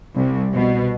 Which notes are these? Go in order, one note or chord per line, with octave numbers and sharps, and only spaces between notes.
C2
B2